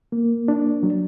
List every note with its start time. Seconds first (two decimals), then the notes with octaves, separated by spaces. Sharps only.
0.12 A#3
0.48 D4
0.83 F#3